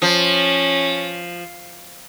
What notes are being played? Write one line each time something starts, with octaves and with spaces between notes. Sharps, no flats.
F3 C#4